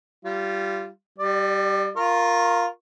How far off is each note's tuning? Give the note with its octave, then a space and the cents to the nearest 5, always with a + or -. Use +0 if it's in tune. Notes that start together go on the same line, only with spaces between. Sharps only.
G3 -15 F4 -25
G3 -10 D5 +30
F4 +0 A#4 +0 C#6 -40